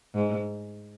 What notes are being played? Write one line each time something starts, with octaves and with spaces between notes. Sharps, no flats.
G#2